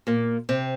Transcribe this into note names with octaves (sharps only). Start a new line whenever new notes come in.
A#2 A#3
C3 C4